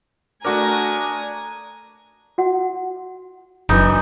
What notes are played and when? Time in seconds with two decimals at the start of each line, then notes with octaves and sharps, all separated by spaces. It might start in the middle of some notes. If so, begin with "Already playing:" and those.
0.45 A3 D4 F#4 A#4 G#5 A#5 D#6
2.38 F#4 F#5
3.69 F#1 F#2 E3 D4 D#4